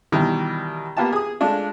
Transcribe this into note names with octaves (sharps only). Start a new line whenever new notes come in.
B2 D#3 E3 G3
A#3 B3 F4 G4 A5
G#4 D#6
G#3 A3 D4 F4